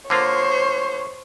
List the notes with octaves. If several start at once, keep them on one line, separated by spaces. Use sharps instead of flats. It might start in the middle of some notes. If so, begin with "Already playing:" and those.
D3 A#3 F4 C5 C#5